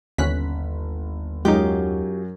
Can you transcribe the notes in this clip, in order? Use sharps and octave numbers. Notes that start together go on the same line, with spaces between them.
G1 D#2 C#4 F#6 B6
F#2 F#3 G#3 D#4 F4 G4